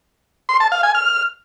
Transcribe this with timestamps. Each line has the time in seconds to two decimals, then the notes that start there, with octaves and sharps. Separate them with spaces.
0.49 C6
0.60 A5
0.72 F5
0.83 G#5
0.95 F6